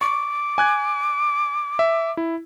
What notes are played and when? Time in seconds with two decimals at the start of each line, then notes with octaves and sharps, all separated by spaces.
0.01 C#6 D6
0.58 G#5 F#6 G#6
1.79 E5
2.17 E4